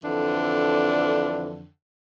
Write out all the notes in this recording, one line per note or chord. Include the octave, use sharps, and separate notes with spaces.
F2 D3 E3 D4